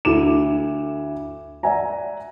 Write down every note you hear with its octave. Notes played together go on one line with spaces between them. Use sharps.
D2 E4 A4 D6 E7
D5 E5 F#5 G#5 A#5